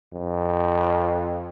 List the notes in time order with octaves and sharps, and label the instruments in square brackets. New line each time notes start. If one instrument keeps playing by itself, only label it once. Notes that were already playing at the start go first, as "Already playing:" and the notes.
[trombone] F2